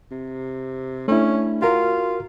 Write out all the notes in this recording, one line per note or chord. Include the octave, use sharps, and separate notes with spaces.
C3
A3 C#4 D4 E4
F4 F#4 A#4